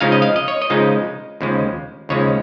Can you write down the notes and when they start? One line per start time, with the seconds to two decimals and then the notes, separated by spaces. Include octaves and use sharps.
0.01 C#3 F3 G#3 D#4 F5
0.12 D#5
0.22 F5
0.36 D#5
0.48 C#5
0.62 D#5
0.70 C#3 F3 G#3 D#4
1.41 D#2 C#3 F3 G#3
2.09 D#2 C#3 F3 G#3 C#5